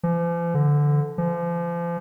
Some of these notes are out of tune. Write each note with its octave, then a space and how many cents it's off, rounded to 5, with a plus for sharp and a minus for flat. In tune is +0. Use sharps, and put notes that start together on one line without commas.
F3 -45
D3 -5
F3 -35